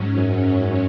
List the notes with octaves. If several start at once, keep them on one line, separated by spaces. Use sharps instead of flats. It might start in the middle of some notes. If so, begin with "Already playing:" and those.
Already playing: G#2 F#3 C#4
F#2